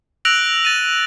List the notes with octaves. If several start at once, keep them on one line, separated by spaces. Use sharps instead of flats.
E6 F#6 A#6 D7 F7 F#7
A6 D#7